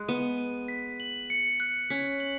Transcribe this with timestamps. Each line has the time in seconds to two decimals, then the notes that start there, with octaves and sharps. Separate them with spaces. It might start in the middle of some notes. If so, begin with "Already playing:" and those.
Already playing: G#3 F#6
0.08 B3 D#7
0.38 D#7
0.68 B6
1.00 F#7
1.30 C#7
1.60 F#6
1.90 C#4 B6
2.20 F#7